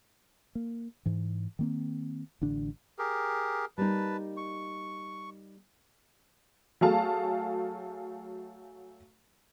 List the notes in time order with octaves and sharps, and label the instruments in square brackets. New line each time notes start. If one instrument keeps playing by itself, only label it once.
[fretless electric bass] A#3
G#2 E3
D#3 A#3 C4
A1 D3 D4
[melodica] G4 G#4 A#4
[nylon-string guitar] G3 A#3 D#4 [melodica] B4 A5
[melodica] C#6
[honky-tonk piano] F#3 A3 G#4 F5 A5